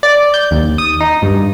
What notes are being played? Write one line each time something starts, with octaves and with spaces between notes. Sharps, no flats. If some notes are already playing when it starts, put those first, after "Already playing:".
D5
G6
D#2
D#6
D#4
G2